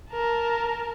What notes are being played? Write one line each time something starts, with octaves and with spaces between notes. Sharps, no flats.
A#4 A5